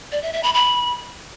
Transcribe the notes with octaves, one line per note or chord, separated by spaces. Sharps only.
D5
E5
E5
B5
B5